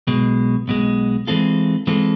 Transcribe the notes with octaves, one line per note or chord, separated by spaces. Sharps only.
B1 B2 G#3
B1 B2 G#3
E3 G#3 C4 F4 A4
E3 G#3 C4 F4 A4